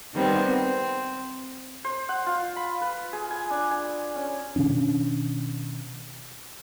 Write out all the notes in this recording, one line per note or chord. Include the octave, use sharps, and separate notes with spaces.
D#3 G3 B3 C4
C4
C5
F#5
F4
B5
B4
G#4
G#5
D4
G#5
C#4
B2 D#3 C#4 D4